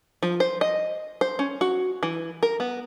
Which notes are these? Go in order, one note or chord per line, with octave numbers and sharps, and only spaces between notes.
F3
C5
D#5
C5
C#4
F#4
E3
A#4
B3